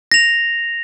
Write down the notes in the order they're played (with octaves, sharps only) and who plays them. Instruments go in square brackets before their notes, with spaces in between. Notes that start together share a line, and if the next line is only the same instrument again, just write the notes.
[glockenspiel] A#6 F7